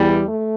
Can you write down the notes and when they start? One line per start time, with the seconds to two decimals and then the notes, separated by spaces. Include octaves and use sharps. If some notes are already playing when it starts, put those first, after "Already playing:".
Already playing: E2 E3 G3
0.26 A3